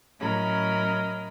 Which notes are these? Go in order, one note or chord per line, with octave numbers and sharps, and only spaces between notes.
A2 F#3 C#4 A#4 D#5 B5